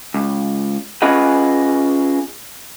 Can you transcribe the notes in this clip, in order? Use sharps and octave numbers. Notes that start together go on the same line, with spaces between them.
C#2
C#4 F4 G#4 B4 D#5 F#5